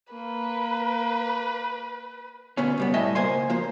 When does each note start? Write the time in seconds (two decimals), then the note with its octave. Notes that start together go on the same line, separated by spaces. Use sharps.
0.13 A#3 B4
2.57 D2 B3 C#4
2.78 C#2 G3 B3
2.94 A2 G3 D#5 E5 G#5
3.15 C#2 A#3 C5 G#5 C6
3.49 F3 A#3 C5